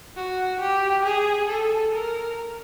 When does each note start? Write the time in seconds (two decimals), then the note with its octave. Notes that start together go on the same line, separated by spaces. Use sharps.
0.16 F#4
0.60 G4
1.05 G#4
1.48 A4
1.94 A#4